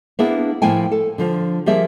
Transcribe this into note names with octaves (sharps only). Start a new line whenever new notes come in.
A#3 B3 D4 E4 G#4
A2 F3 A#3 E4 G5 G#5
A4
D3 F3 F4
F3 G3 A#3 G4 G#4 E5